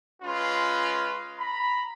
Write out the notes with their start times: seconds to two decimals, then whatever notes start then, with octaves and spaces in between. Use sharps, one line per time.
0.23 G#3 C#4 F4 B4 C6
1.38 A#5 B5